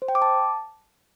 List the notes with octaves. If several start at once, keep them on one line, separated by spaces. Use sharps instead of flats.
C5
G5
D6
A5